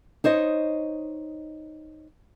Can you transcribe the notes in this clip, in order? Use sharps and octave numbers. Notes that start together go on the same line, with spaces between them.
D#4 C5 C#5 D#5